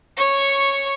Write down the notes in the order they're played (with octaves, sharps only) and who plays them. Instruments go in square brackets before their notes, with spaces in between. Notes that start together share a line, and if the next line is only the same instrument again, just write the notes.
[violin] C#5 C#6